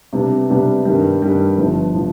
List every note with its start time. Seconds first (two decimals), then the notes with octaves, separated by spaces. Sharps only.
0.13 C3 G3 B3 D4
0.49 C3 G3 B3 D4
0.85 G2 D#3 G3
1.22 G2 D#3 G3
1.58 G1 G2 F3
1.95 F3